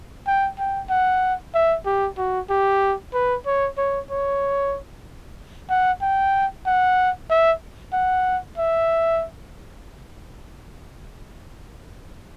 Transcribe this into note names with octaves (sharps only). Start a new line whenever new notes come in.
G5
G5
F#5
E5
G4
F#4
G4
B4
C#5
C#5
C#5
F#5
G5
F#5
E5
F#5
E5